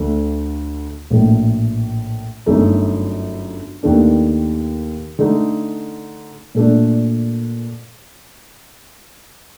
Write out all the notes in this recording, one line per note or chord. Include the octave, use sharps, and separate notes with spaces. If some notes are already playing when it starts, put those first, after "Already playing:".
Already playing: D2 D3 A3 D4
A#1 A2 A3
G1 F#2 F#3 A3 D#4
D#2 D#3 A3 D4
D3 A3 D#4
A#2 A3 D4